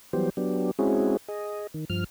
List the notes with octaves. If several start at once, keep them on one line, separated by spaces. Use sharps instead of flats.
E3 F#3 G3 B3 G4 C5
F#3 B3 D4 G4
G#3 C4 C#4 E4 F#4 G#4
G#4 D#5
D#3
G2 F3 F6